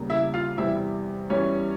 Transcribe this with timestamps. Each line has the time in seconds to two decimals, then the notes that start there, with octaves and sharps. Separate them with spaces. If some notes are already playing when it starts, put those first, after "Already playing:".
Already playing: E2 C#3 G3 A#3
0.10 E4 E5
0.34 F4 F5
0.57 E2 C3 E3 G3 E4 E5
1.29 E2 E3 G3 C#4 C#5